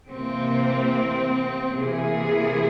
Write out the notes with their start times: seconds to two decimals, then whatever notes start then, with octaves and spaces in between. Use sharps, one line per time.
0.11 C3 E3 A#3 C4
1.76 C3 E3 A#3 G#4